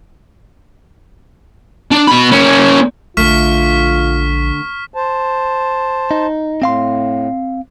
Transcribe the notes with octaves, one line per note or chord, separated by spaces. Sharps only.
D4
B2 B5
A#3 C#4
A#1 D3 A3 F4 C#6 F6 B6
C5 A5
D#4
A2 C4 F5 C6